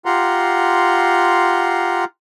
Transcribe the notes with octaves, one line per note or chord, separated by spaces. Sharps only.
F4 G4 F#5 A#5 C6